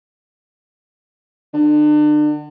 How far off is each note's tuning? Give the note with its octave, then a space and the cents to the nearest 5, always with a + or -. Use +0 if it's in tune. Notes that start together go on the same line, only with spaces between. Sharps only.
D3 +35